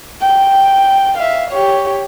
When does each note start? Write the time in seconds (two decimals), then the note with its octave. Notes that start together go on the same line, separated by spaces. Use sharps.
0.21 G5
1.18 E5 F5
1.51 G4 C#5